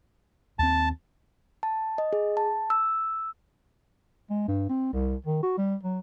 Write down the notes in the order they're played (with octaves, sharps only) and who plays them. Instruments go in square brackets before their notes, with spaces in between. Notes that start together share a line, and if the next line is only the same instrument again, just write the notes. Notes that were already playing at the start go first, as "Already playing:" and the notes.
[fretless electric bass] D#2 C4 [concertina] A5
[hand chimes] A5
D#5
G#4
A5
E6
[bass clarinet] G#3
G2
C4
C2
D#3
F#4
G3
F#3